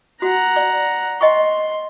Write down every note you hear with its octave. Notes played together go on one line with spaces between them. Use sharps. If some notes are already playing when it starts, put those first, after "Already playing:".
F#4 F#5 A#5
D5
D#5 G5 C6 C#6